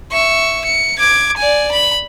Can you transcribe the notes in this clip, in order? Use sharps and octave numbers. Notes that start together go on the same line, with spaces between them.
E5 C#6
C#7
D6 G#6
D5 G#5
B5